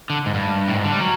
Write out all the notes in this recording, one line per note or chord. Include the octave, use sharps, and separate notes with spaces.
D3
G#2
G2
A2
G#2
D3
G3
F#3